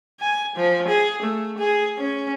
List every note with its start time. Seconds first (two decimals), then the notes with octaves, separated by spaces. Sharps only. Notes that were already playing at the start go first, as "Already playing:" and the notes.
0.20 G#5
0.56 F3
0.88 G#4
1.22 A3
1.58 G#4
1.98 C#4